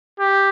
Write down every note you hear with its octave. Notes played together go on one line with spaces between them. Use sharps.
G4